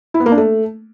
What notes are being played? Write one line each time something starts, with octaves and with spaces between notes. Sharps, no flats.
E4
B3
A#3
D4
A3